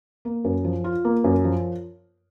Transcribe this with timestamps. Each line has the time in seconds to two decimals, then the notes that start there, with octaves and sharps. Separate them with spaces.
0.25 A#3
0.44 F#2
0.64 F3
0.84 F4
1.05 A#3
1.24 F#2
1.44 F3